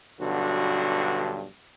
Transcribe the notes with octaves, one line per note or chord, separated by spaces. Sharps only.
B1 G2 D3 F#4